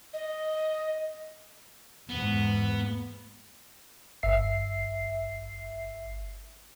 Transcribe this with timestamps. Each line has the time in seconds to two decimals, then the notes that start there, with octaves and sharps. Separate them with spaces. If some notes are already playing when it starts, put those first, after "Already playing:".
0.13 D#5
2.09 E2 G#2 B3
4.23 G1 E5 C7